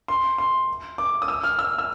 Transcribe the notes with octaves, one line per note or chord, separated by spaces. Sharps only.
C6
C6
D6
D#6
E6
F6
E6
E6